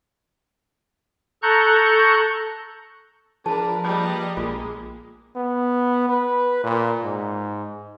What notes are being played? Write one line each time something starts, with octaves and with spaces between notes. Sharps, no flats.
A4 A#5 C#6 F#6 G6
F3 D4 G#4 A#4 B4 A5
G3 A#3 B4 D#5
A#1 G#3 A#3 F4
B3
B4
A#2
G#2